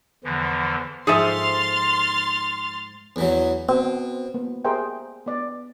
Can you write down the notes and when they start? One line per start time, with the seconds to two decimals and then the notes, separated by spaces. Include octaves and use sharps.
0.24 E2 D3 E3 F3
1.07 G#2 F3 G#4 A4 E5 C6 F6 A6
3.16 E2 E3 F#3
3.69 B2 C4
4.34 A#3 B3
4.65 G4 G#4 A#4 C5 E5 G5
5.26 B3 D5